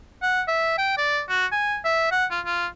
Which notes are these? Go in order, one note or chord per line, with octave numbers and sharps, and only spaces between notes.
F#5
E5
G5
D5
F#4
G#5
E5
F#5
F4
F4